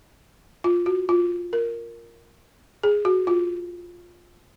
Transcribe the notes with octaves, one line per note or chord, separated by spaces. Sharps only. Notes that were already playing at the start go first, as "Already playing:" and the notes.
F4
F#4
F4
A#4
G#4
F#4
F4